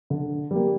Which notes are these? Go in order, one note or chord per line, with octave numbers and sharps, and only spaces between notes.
D3
G3 A#3